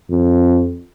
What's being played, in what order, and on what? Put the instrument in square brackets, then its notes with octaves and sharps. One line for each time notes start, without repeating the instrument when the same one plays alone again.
[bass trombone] F2